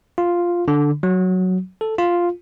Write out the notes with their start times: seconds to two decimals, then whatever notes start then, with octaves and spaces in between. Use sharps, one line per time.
0.18 F4
0.68 D3
1.03 F#3
1.81 A4
1.98 F4